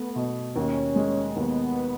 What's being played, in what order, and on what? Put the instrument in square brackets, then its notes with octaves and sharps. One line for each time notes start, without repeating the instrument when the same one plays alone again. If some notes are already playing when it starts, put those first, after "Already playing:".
Already playing: [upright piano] A3 [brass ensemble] B3
[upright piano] B2
[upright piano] D#2 [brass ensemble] C#4
[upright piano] G#3
[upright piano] D#2 [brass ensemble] B3